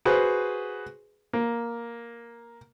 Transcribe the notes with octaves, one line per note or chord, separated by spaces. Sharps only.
F#4 G#4 B4 C5
A#3